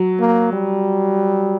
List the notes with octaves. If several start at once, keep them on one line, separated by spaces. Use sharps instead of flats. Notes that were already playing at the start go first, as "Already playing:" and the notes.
Already playing: F#3
A#3
G3